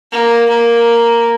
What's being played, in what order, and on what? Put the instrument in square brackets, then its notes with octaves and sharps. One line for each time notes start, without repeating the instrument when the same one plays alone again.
[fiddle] A#3
A#3